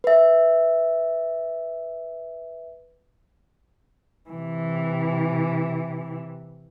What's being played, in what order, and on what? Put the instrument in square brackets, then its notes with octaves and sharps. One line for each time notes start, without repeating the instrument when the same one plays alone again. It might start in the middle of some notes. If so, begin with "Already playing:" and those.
[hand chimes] B4 E5
[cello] C3 E3